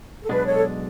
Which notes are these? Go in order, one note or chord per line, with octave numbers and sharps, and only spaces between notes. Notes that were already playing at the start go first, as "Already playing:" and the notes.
A4
B1 B2 G#3 D4 B4
A4 C#5